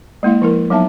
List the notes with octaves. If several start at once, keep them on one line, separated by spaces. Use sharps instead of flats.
G#3 A#3 E4 F5
F3 E4 A#4
F#3 B3 D#4 E5 A5